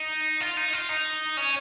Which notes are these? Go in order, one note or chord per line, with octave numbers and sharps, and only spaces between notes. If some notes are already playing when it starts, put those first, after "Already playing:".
Already playing: D#4
F4
D#4
F4
D#4
C#4